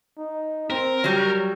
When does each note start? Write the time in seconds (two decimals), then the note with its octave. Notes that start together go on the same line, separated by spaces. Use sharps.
0.18 D#4
0.70 C4 A#4
1.04 F#3 G3 C#5